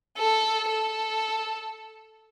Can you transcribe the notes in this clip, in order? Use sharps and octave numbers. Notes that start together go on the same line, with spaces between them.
A4
A4